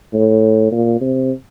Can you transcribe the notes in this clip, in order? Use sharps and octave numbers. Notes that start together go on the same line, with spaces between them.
A2
A#2
C3